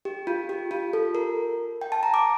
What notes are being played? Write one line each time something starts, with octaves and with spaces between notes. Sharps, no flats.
G4
F4
G4
F4
A4
A#4
G5
A5
A#5
D6